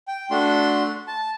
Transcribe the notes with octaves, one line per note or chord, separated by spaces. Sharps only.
G5
A3 D4 F#4 C6
A5